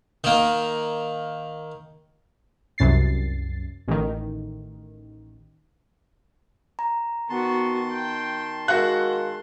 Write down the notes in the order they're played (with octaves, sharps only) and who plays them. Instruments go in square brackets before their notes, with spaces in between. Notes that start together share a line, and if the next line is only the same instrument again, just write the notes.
[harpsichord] D#3 A#3
[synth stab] C2 F#2 A6 C7
A1 D#3
[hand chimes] A#5
[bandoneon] D#3 A5 C6 [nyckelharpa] B3 F#4
[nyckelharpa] G5
[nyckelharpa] G#3 [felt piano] F#4 F#5 F#6 [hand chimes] A#4 F5